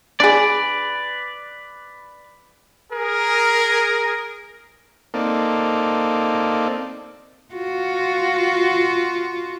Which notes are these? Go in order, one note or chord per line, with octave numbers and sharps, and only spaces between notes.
D4 G#4 B4 D5
G#4 A#4
A#3 C4 D#4 A4 D5 F5
F4 F#4